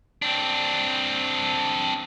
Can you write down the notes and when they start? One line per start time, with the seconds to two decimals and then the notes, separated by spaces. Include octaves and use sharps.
0.22 C4 D4